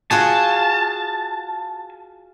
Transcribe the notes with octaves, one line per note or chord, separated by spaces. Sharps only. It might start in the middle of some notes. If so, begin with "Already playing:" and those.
F4 F#4 G#4 A5